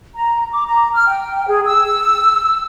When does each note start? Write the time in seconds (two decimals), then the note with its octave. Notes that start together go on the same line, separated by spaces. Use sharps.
0.15 A#5
0.51 D6
0.66 A#5
0.95 F6
1.07 G5
1.48 G#4
1.65 E6